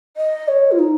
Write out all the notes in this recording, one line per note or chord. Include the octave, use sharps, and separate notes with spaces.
D#5
C#5
F4
D#4